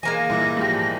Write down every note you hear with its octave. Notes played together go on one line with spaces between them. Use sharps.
E3 G#3 A#3 A#4 G#5 A#6
A#2 G3 E4 E5
G#2 F3 G4